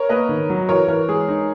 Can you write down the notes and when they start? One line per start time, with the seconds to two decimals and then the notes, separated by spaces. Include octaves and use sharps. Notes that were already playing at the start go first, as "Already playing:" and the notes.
Already playing: A#4 C#5
0.09 A#3 B4 D#5
0.29 D#3
0.50 F#3
0.69 E3 A#4 C#5
0.88 E3 A#4
1.08 G#3 G#4
1.29 D#4